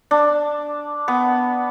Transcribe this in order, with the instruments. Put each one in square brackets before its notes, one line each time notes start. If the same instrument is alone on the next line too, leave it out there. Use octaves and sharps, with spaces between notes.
[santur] D4
B3